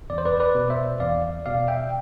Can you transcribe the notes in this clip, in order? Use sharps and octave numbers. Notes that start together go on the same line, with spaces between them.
E2 D5
C5
B4 D5
B4 D5
B2
C5 E5
E2 D5 F5
B2 D5 F5
E5 G5